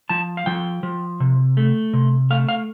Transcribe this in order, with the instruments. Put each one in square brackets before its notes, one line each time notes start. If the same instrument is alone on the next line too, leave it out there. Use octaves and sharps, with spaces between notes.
[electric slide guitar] F3 A5
F5
F3 G5
F3
C3
A3
C3
A3 F5
F5